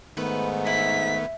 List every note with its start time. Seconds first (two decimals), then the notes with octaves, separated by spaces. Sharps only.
0.17 G#2 D#3 A3 B3 B4
0.67 E4 B6